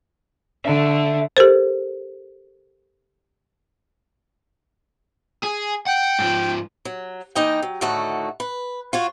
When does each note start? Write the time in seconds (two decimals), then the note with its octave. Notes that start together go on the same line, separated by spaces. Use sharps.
0.65 D3 E5 A5
1.37 G4 A4 A#4 C5
5.44 G#4
5.87 F#5 G5
6.19 G#2 F3
6.85 F#3
7.35 E3 A#3 D#4 D#5 G5
7.62 F#3
7.81 A2 D3 D#3 A3 F#4 F#5
8.40 B4
8.93 F4 F#4 C#5